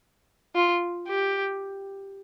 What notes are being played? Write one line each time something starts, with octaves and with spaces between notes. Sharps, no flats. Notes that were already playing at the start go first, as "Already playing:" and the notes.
F4
G4